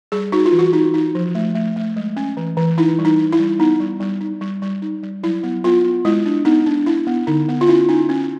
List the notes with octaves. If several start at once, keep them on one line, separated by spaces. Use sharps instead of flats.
G3 G#4
D#4 F#4
F4
E3
F#4
D#4
D#4
F3
A3
A3
A3
G#3
C#4
E3
E3
D#4 E4
G3
D#4
D#4
E4
G3
B3 D#4
G3
G3
D#4
G3
G3
D#4
G3
F#3 E4
B3
B3 F4
B3
G#3 E4
D4
B3 D#4
D4
D4 E4
B3
D3 D#4
B3
F4
C#4 E4
C#4 D#4
C#4